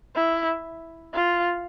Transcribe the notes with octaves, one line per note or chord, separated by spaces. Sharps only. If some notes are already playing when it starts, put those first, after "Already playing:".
E4
F4